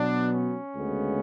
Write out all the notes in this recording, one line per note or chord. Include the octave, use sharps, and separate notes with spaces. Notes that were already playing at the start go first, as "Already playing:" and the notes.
Already playing: B2 F#3 B3 D4
C#4
D2 C#3 G#3 B3